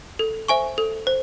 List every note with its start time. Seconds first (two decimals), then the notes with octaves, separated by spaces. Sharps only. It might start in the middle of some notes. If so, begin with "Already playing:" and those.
0.19 A4
0.48 C5 E5 G#5 C#6
0.78 A4
1.07 C5